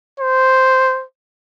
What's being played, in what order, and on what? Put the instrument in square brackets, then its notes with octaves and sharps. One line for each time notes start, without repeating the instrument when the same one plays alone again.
[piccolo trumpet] C5